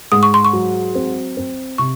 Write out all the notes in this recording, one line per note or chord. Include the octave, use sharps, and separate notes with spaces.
G#2 D#6
C#6
C6
C#6
F#3
C4
C4
C3 C#6